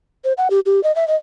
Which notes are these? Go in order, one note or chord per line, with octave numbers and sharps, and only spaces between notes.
C5
F#5
G4
G4
D#5
E5
D#5